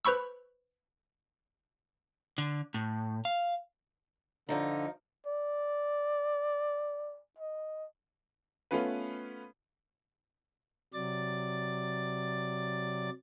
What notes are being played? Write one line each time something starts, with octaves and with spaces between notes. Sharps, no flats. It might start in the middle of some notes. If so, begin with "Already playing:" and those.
B4 C5 B5 C#6 E6
D3
A2
F5
G2 D3 F3 D#4
D5
D#5
A3 B3 C#4 F4 B4
C3 F#3 D5 A6